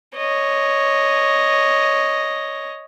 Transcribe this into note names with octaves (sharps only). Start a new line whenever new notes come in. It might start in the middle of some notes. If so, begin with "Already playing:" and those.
C#5 D#5